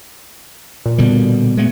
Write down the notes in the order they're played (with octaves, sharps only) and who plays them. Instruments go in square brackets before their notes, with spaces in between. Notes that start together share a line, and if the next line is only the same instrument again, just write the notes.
[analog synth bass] A#2
[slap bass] B2 D3 G3
G#3 A3 B3